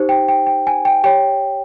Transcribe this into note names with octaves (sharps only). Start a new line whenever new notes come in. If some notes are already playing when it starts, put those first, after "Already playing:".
Already playing: D#4 G4 C5
G5
G5
G5
G#5
G5
G4 C#5 G5